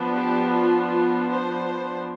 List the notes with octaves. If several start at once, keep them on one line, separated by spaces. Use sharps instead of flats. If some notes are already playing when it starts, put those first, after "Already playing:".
Already playing: F3 B3 D4
G4
F4
F4
C5